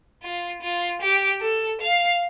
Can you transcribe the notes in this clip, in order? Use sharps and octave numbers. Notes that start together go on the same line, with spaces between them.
F4
F4
G4
A4
F5